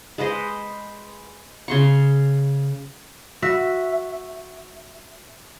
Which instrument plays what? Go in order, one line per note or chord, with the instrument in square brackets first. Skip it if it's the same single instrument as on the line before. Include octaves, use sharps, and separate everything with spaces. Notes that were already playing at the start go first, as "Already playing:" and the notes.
[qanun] G#3 B4 C5 D#5
C#3 C6 C#6
[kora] F#4 [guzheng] E5